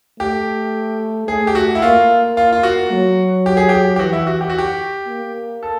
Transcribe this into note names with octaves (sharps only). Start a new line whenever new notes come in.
A3 G4
A3 G#4
G4
F#4
E4
A#3 F4
F4
F4
F#4
F#3
G4
G#4
G4
G4
E3 F#4
E4
F#4
G4
F#4
G4
A#3
A4